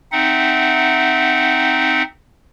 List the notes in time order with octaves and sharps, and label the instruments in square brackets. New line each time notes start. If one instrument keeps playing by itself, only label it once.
[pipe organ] C4 D#4 E5 F#5